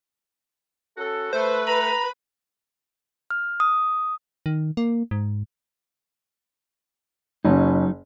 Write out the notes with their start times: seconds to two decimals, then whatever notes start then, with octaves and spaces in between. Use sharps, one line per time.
0.97 C#4 F#4 A4
1.33 A3 B4 C5
1.67 A#5 B5
3.30 F6
3.60 D#6
4.46 D#3
4.77 A#3
5.11 G#2
7.45 F#1 F#3 C#4 D#4